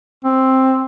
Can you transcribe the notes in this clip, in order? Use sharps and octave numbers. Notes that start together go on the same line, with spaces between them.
C4